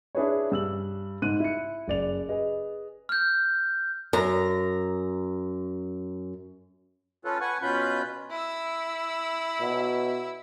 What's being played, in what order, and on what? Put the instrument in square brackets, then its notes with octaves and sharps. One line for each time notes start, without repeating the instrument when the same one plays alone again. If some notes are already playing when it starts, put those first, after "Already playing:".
[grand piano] D4 E4 G#4 B4 C#5
G2 E6 F#7
G#2 F#6 D#7
E4 C#7
F#1 D5 F7
G#4 B4 D#5
[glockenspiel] F6 G6
[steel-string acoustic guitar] F#2 A#5
[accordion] C#4 F4 A4 B4
B4 F#5 G#5 C#6
B2 C#4 F4 B4 B5 G6
[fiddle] E4 E6
[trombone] B2